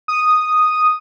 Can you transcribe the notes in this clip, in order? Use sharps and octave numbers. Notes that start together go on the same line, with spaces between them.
D#6